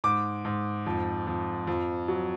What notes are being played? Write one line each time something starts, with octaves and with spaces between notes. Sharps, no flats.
G#2 D6
G#2
F2
F2
F2
F#3